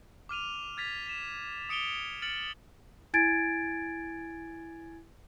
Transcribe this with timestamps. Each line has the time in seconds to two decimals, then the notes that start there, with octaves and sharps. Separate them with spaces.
0.29 D6 F6 D#7 F7
0.77 F6 G#6 A6 B6 F7
1.06 B6 E7
1.69 D#6 C#7 D7 F7 G7
2.22 F6 A6 C#7 D7 F#7
3.14 E4 G#5 G#6 A6 D7